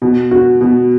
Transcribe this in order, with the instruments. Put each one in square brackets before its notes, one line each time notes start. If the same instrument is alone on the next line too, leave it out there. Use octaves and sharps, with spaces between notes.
[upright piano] B2
F#4
B2